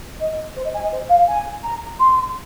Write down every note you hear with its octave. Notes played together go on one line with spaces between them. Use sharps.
D#5
C5
D#5
G#5
D#5
C5
F5
G#5
A#5
C6